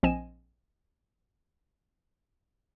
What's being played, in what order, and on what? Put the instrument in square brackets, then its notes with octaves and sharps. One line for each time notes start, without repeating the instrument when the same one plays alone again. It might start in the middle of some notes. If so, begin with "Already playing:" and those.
[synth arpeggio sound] A#1 F3 C4 D#5 G#5 E7